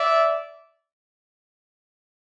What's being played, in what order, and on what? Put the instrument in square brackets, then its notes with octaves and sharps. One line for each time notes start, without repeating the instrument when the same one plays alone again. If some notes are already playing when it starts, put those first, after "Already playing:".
Already playing: [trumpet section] D5 E5